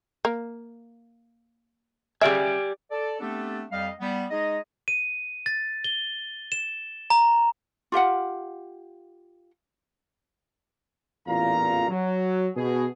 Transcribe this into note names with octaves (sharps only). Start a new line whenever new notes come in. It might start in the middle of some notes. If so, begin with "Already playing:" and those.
A#3
C#3 G4 D5 E5 G#5
A4 D5
A3 B3 C4 D4 G4 A4
F2 G3 D#5 F5
G3 B3
G#3 D#4 G#4 D#5
D#7
A6
G7
E7
A#5
F4 G4 F5 F#5
A1 E2 A#2 F4 F5 A#5
F#3
B2 G#4